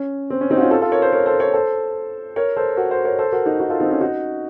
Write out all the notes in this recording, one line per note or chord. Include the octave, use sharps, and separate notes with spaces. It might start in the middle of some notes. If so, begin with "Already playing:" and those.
Already playing: C#4
C4
C#4
C4 D#4
F#4
C#4 F4
F4 A4
F4 A4
A#4 C#5
A4 C5
A#4 C#5
A4 C5
A#4 C#5
A4 C5
A#4 C#5
A4 C5
F#4 A#4
A4 C5
A#4 C#5
A4 C5
F#4 A#4
D#4 F#4
D#4 F#4
F4 A4
C4 D#4
C#4 F4
D#4 F#4